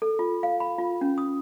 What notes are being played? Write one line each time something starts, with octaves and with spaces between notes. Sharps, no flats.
A4
F4
F5
B5
F4
C#4
D#6